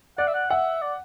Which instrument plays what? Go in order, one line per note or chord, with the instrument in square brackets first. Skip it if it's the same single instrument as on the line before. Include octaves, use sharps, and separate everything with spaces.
[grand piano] D5 [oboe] F#5
[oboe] E5
F#5
[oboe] E5 [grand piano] F#5
[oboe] D5